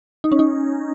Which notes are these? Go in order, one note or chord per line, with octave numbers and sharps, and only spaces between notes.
D#4
C#4
D#4